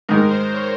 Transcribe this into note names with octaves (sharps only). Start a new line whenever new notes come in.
G#2 D#3 G#3 A#4
C5
C#5